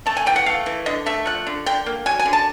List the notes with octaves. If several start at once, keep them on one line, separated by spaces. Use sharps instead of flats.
A3 A5
G#5
E3 G5
F#5
A3 F5
E3
D3 D#5
A3 E5
F3 F#5
D3
D3 G5
A#3
F#3 G#5
G#5
D3
A5